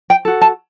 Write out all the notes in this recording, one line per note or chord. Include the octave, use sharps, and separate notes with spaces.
G5
F#4 A4
A5